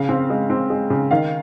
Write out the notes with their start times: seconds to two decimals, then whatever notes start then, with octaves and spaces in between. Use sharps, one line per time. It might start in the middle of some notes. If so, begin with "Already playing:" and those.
Already playing: C#3 F5
0.09 C4
0.30 G#3
0.50 C4
0.70 G#3
0.90 C#3
1.11 D#3 F5